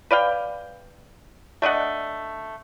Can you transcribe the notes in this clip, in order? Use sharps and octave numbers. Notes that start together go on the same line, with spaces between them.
B4 D5 F5 G5
A3 D4 D#5 F#5